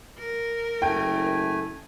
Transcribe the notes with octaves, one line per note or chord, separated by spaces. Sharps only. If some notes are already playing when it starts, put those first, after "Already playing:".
A#4
F#1 A3 G5 G#5